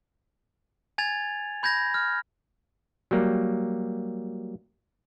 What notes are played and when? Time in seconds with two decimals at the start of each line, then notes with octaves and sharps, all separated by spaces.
0.98 G#5 G#6 A6 F7
1.63 B5 G6 G#6 A#6
1.94 F6
3.11 F#3 G3 A#3